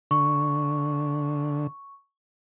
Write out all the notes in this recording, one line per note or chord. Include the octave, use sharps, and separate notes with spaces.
D3 C#6